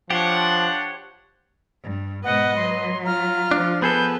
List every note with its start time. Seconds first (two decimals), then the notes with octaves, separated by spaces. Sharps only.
0.10 F3 D4 G4 C5 C#5 F#5
1.83 G2
2.24 G#2 B2 B4 D#5 F#5
2.56 F#3 C6
3.04 F4 A#5 F6
3.51 F3 D4
3.82 B3 G#4 A4 B4 G6